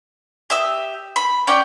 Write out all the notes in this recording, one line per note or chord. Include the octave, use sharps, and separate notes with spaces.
G4 E5 D#6
B5
C#4 G4 D5 G5